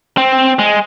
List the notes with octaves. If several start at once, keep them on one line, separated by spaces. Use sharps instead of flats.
C4
G#3